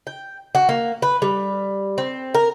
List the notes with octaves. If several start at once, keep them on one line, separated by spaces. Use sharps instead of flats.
G5
F#4
A#3
B4
G3
C4
A#4